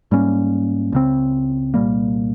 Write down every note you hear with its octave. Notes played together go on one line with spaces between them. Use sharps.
G#2 G3 A#3 C#4
C#2 C#3 F3 C4
C2 A#2 G3 A#3